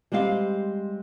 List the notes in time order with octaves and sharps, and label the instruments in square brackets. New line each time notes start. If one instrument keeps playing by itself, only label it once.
[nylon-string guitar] G3 G#3 C4 G4 F5